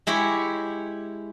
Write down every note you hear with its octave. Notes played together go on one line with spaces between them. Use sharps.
G#3 E4 G4 C#5